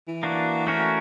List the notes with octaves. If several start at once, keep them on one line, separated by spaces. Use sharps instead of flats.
E3
A#3 D4 F#4
A3 C#4 F#4 A#4 C#5